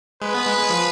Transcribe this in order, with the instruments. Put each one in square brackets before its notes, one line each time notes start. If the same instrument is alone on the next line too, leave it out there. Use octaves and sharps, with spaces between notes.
[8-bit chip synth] G#3 [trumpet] B4
[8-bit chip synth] B3
G#3
G#3
F3